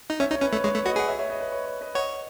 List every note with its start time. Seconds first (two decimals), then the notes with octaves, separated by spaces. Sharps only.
0.10 D#4
0.20 C#4 C#5 E5
0.30 D#4 C#5
0.41 C#4 B4
0.53 A3 C#5
0.64 G#3 C#5
0.75 A3
0.85 F#4 B4 D#5
0.96 G#4 F#5
1.08 C#5 E5
1.19 C#5 E5
1.30 B4 D#5
1.41 B4
1.52 C#5
1.66 C#5
1.81 B4 D#5
1.95 C#5 D#5 F#5